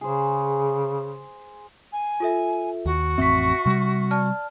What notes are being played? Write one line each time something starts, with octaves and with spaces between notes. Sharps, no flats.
C#3 G#4 C5
G#5
F4 A4 E5
D#2 F#4
A1 F2 C4 E5 C#6 B6
C3 G3
D5 A5 F6